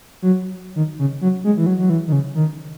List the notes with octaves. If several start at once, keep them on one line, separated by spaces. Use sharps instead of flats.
F#3
D#3
C#3
F#3
G#3
E3
F#3
F#3
E3
D#3
C#3
D#3